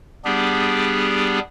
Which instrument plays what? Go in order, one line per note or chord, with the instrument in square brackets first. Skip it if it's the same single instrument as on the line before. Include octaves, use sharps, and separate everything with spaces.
[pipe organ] G3 B3 D4 G4 G#4